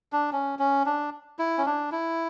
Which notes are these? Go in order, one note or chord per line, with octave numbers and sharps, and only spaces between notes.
D4
C#4
C#4
D4
E4
C#4
D4
E4